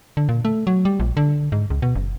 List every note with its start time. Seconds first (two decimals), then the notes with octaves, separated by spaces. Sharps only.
0.17 D3
0.29 A#2
0.45 A3
0.67 F#3
0.85 G3
1.00 A#1
1.17 D3
1.52 G#2
1.70 C#2
1.82 B2
1.95 F#1